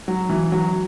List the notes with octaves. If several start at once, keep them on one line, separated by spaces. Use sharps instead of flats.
F#3
E3
F#3